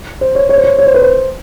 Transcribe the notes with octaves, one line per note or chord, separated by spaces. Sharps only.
C5
C#5
C#5
C5
C#5
C#5
C5
B4
C5